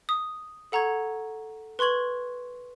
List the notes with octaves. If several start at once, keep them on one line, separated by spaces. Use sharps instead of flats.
D#6
A4 F#5 A#5 C#6 G#6
B4 C6 C#6 G#6 F#7